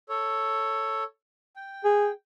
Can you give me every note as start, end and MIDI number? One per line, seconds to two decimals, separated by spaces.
0.09 1.03 69
0.09 1.03 73
1.56 2.11 79
1.85 2.10 68